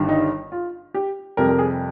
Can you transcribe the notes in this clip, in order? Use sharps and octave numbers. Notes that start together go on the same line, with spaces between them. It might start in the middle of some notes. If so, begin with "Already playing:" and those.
Already playing: G1 G2 D#3 G3
D#4
F4
G4
F2 C3 G3 A#4
A#4
G#4